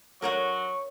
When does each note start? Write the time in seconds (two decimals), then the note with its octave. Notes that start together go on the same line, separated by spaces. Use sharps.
0.22 F#3 A#4 C#5 F#5 C#6